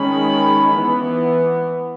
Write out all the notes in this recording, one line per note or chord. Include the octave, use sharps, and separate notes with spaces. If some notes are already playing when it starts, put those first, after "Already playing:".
Already playing: D#3 G#3 C#4 B5
E3 B3